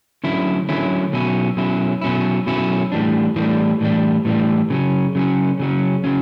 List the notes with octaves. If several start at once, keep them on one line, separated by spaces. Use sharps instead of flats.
D3 F#3 C#4 E4
D3 F#3 C#4 E4
B2 F#3 C#4 E4
B2 F#3 C#4 E4
B2 F#3 C#4 E4
B2 F#3 C#4 E4
A2 E3 G3 D4
A2 E3 G3 D4
A2 E3 G3 D4
A2 E3 G3 D4
C#3 F#3 C#4
C#3 F#3 C#4
C#3 F#3 C#4
C#3 F#3 C#4